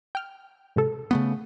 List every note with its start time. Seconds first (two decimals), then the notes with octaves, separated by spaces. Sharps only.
0.15 G5 F6
0.76 G#2 C3 A4
1.11 C#3 A3 B3